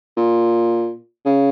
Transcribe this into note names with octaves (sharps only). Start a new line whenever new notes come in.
A#2
C#3